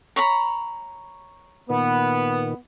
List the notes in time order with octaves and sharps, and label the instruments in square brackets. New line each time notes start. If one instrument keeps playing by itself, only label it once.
[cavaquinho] C#5 A#5 B5
[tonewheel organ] A#2 D#3 [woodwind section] B3